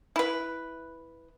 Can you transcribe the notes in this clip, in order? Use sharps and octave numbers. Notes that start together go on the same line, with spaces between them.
E4 B4